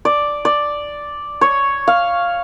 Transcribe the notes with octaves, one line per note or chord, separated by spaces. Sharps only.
D5
D5
C#5
F5